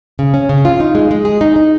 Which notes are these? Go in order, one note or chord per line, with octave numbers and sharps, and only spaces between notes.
C#3
C#4
C#3
F4
D#4
G#3
G#3
G#4
D#4
D#4